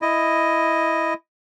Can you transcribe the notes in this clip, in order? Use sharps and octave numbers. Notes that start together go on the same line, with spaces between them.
E4 D#5